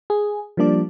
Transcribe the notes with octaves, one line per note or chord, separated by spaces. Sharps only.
G#4
F3 G3 A#3 D4 D5